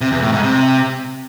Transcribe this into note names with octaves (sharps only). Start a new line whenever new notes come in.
C3
E2
A2
G#2
C3